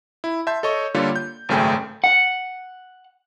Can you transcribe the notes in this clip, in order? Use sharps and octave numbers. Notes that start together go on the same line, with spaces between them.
E4
E5 A5 C6 G6
A4 C#5 D#5 C#6
D3 G3 A#3 F4 A4 C#5
G6
G#1 F#2 C#3 A3 G5 G#5
F#5